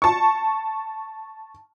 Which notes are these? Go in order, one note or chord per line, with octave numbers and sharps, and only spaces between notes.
A5 C#6